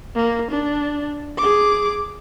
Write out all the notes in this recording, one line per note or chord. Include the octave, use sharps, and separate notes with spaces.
A#3
D4
G#4 D6